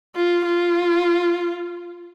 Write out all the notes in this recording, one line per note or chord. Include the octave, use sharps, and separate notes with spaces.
F4
F4